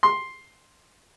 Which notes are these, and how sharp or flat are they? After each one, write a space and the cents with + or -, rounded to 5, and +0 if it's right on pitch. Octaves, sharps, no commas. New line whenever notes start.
C6 +5